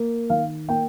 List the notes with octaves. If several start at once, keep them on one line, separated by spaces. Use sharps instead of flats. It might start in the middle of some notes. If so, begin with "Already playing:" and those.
Already playing: A#3
D#3 F5
A#3 G5